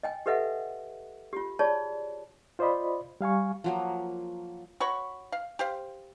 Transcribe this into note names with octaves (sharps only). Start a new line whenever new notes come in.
D#5 G5 G#5
G4 A4 B4 D#5 E5 F#5
F4 G4
F4 G#4 C#5 D5 A5
F4 C5 D5 D#5 B5
G3 F5 G#5 C#6
F3 F#3 A#3
F#4 C#5 B5 C#6
F5
G4 C5 F5